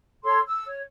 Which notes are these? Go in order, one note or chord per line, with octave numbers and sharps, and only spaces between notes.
A4 C#5 C6 E6
E6
C#5